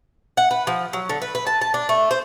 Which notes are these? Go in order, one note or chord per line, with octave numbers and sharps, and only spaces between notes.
F#5
B4
F3
F#3
D3
B4
B4
A5
A5
D4
A3
C5